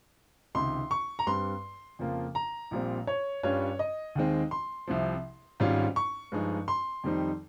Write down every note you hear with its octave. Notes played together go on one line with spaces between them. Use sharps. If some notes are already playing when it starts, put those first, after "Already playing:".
C#2 C3 D#3 C6
C#6
A#5
G2 G3 C4 C6
F2 C#3 F3 A#3 F4
A#5
A#1 A#2 G3 C4
C#5
G2 G3 C#4 F4 C#5
D#5
D#2 D#3 G#3 C4
C6
C2 C3 F3
G#1 G#2 G3 C#4 F4
C#6
G2 F3 G#3 D#4
C6
F2 D#3 G3 C4 D#4